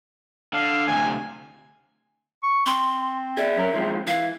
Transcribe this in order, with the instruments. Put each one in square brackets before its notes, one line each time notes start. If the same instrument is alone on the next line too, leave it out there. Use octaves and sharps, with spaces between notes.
[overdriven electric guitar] D3 [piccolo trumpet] F5
[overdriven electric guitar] D2 C3 [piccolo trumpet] G#5
[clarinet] C#6
[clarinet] C4 [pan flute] C6
[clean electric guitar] G#4 D5 [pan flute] E5
[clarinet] F#3 [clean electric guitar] C#4 A#4
[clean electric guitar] D#3 F3 G#3 [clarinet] C4
[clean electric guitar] E3 [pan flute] F5